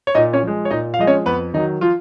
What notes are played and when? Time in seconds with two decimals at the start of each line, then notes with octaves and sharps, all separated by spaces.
0.07 C#5
0.15 A#2 D#4 D#5
0.33 C#4 C#5
0.43 F3 G#3
0.65 C#5
0.71 A#2 D#4 D#5
0.94 F5
0.99 F3 G#3 D#5
1.07 C#4 C#5
1.26 F2 B3 B4
1.54 D#3 F#3 D#4
1.81 F3 F4